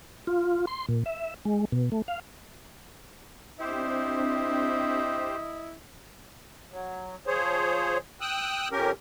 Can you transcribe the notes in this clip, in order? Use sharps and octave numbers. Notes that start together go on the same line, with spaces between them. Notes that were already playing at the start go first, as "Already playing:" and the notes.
F4
C6
A#2
E5
G#3
B2
A3
F5
C4 D4 E4 G4 C5 D#5
F#3
F3 G#4 C5 C#5
G5 D#6 E6 F#6
F2 C#4 G4 A#4